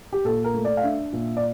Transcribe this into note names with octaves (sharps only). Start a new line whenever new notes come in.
G4
A#2 A4
A#4
A3
D5
F5
D4 E5
A#2
D5